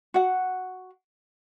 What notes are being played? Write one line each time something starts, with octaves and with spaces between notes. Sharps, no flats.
F#4 F#5